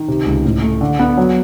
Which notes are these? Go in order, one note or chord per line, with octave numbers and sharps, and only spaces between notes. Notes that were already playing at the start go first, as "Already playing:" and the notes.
Already playing: D#3
C3
C#2
A2
A3
D3
B3
F#3